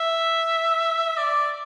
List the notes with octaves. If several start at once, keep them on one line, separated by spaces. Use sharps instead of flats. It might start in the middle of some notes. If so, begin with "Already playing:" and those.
Already playing: E5
D5